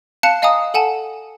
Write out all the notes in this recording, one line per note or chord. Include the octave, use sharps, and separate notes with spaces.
F5 A5 F#6 C#7 F7
D#5 F5 G#5 A#5 D#6
A4 F#5 G#5 A5